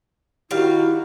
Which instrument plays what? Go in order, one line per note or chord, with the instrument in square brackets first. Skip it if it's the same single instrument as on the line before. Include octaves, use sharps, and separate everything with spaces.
[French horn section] D#3 F#4 [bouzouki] G3 F5 [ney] E4